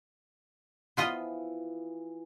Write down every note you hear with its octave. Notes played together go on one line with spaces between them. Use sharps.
E3 F3 B3 F4 D#5